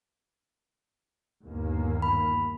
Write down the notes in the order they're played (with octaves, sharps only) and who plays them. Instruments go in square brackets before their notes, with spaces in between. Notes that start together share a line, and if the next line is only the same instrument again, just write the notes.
[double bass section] G1 D#2 A#3
[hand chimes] B5